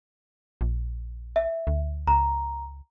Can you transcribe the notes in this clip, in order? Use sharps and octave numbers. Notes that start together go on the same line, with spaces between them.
A#1
E5
D2
C#2 A#5